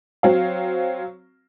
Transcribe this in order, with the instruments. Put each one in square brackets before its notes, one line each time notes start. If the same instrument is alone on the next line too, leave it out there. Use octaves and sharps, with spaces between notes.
[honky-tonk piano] F#3 C4 F5